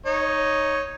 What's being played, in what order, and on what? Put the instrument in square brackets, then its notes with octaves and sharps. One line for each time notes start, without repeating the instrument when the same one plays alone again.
[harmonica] D#4 C#5